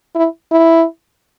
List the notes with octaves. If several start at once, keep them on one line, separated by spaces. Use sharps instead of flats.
E4
E4